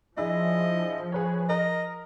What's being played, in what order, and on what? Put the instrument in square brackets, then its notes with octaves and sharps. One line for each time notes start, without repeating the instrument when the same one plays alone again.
[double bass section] F3 [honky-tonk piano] D4 E4 G#4 [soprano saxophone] D#5
[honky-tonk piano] G#4 B4 C#5
[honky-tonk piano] A#4 A#5 [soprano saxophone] D#5